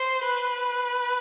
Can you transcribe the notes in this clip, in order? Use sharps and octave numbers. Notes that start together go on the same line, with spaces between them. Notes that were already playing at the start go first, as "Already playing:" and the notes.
Already playing: C5
B4